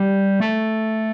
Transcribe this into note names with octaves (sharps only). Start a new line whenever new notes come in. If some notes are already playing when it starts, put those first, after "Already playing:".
Already playing: G3
A3